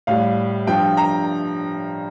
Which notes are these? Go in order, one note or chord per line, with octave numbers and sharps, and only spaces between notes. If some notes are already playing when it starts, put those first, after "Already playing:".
A2 G3 F5
G2 F3 G5
A#5